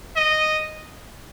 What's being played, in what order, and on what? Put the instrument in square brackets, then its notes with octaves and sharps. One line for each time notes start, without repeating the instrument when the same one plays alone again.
[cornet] D#5